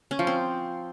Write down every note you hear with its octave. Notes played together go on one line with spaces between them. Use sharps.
C#4
F3
C4